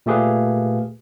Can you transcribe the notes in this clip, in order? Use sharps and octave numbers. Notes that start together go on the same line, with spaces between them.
A#2 A3 G4 G#4 B4 F5